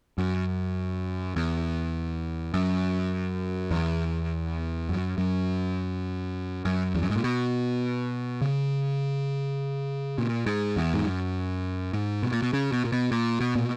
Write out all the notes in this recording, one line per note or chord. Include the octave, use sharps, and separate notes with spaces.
F#2
E2
F#2
E2
F#2
F#2
F#2
E2
F#2
G#2
A#2
B2
C#3
A#2
G#2
E2
G#2
F#2
G#2
B2
A#2
B2
C#3
B2
A#2
B2
A#2
B2
A#2